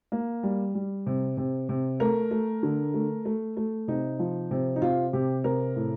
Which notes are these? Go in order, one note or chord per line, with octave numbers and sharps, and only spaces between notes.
A#3
G3
G3
C3
C3
C3
A3 A#4
A3
D3
A3
A3
A3
C3 D#4
F3
C3
D#4
C3 F4
C3 G4
C3 A#4
A2